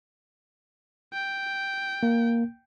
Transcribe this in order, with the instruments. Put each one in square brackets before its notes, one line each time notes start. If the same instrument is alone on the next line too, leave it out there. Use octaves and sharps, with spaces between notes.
[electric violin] G5
[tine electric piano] A#3